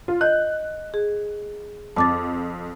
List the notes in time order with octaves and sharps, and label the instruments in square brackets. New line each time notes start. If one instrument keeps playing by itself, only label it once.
[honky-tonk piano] F4
[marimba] D#5 G6 [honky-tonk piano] F#6
[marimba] G#4
[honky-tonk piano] F2 [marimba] A5 D6 A6